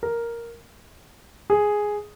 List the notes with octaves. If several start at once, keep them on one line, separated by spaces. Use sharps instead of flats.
A#4
G#4